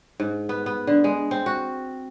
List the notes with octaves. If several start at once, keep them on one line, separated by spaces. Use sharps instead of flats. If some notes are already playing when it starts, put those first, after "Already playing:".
G#2
B3
B3
D3
G#3
C4
F#4